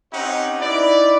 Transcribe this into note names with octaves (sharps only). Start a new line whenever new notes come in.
C4 C#4 D#4 G4 C#5 F#5
D#4 E4 B4 D5